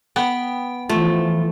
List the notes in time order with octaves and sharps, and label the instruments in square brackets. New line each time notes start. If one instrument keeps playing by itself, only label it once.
[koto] B3 [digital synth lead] G5
[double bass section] E3 F3 [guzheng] A3 [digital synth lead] F4